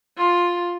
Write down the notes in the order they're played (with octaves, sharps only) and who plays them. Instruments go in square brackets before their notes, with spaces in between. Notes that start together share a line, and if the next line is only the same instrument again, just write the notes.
[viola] F4